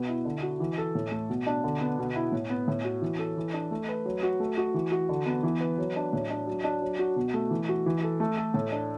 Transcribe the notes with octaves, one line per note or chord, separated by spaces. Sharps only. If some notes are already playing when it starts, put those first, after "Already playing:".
Already playing: B2 B4
E4
D3
F#4
E3
A4
A2
A3
B2
D4
D3
B3
B2
E4
A2
B3
A2
F#4
E3
A4
E3
D4
A3
B4
F#3
F#4
A3
F#4
E3
F#4
D3
B3
E3
B4
F#3
D4
A2
D4
F#3
D4
F#3
F#4
B2
A3
E3
F#4
E3
A4
A3
A4
A2
D4